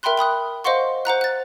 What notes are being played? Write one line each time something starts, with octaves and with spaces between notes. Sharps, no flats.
A#4 E5 G5 B5 C6 F#6
G5 B5 D#6 F#6
C5 D#5 F5 F#5 C6 C#6
C5 F#5 A#5 F#6
F#6 A6